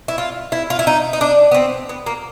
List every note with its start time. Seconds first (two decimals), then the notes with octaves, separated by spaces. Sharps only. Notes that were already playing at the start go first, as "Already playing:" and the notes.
0.08 E4
0.18 F4
0.52 E4
0.70 F4
0.79 E4
0.87 D#4
1.13 D#4
1.21 D4
1.51 B3
1.54 C4
1.89 B3
2.06 A#3